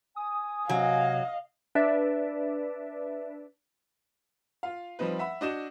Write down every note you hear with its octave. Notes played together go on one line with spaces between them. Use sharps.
G#5 D#6
C3 F#3 D#5 F5
D4 B4 D5 E5
F4 F5
F3 G3 C4 D#4 B4
E5 F#5 B5 E6
D4 F#4 D#5 D#6 G6 E7